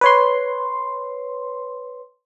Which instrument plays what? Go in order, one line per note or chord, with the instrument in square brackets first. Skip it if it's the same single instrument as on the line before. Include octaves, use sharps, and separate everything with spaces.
[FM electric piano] B4 C#5 C6